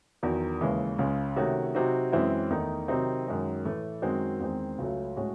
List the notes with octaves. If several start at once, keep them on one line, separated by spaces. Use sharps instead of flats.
E2 D#3 F#3
D#2 C#3 E3 G#3
C#2 C#3 G#3
C3 D#3 A3 C#4 F#4
C3 F#3 C4 D#4 F#4
F#2 E3 G#3 C4 E4
E2 D#3 A3 D#4
C3 D#3 F#3 C4 D#4
F#2 D#3 G#3 C#4
A2 E3 A3
F#2 D#3 G#3 C4 F#4
E2 D#3 G#3 C4
C#2 C#3 F#3 A3 C#4
A2 G#3 C#4 F#4